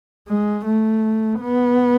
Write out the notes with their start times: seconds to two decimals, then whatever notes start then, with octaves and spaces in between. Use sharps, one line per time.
0.28 G#3
0.66 A3
1.40 B3